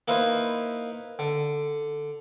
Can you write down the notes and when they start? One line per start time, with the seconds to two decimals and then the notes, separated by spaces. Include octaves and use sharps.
0.08 A#3 D#4 E4 B4 C5
1.19 D3